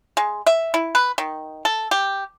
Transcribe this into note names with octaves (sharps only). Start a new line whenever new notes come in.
G#3
E5
E4
B4
D#3
A4
G4